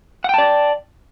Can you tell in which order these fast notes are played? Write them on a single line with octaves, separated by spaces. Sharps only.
F#5 G5 A5 D5